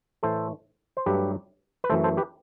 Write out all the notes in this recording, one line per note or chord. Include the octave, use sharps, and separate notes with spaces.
A2 E3 A3 A4 C5
C5
G2 F#3 A3 G4 B4
B4
F#2 E3 A3 A4 C5
A4 C5
G4 B4